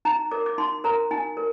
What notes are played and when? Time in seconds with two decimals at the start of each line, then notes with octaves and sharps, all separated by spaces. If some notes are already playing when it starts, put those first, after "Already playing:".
0.05 D#4 A#5
0.31 A#4 D6
0.46 D6
0.58 D#4 C6
0.84 A#4 A#5
1.11 D#4 G#5
1.37 A#4